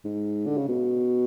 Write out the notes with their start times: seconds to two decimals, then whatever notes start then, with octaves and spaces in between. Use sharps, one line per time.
0.05 G#2
0.46 D3
0.57 C#3
0.69 B2